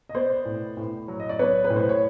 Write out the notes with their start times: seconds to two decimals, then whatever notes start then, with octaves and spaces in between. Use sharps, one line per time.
0.09 D#5
0.15 B3 C5 D5
0.45 A2
0.77 A2
1.08 F#3
1.20 D#5
1.29 D5
1.39 B3 B4 C#5
1.64 B4
1.70 A2
1.76 C5
1.89 C#5